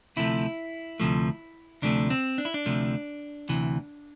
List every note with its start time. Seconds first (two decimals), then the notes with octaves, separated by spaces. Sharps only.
0.16 D2 C3 F3 A3 E4
1.00 D2 C3 F3 A3
1.82 D2 C3 F3 A3 D4
2.10 C4
2.38 D4
2.45 E4
2.54 D4
2.66 D2 C3 F3 A3
3.49 D2 C3 E3